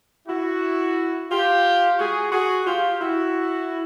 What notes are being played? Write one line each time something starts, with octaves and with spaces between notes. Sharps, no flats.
E4 F#4
F4 G4
F#4 G#4
F#4 G#4
F4 G4
E4 F#4